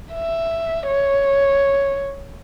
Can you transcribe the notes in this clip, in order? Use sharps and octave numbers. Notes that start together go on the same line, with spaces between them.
E5
C#5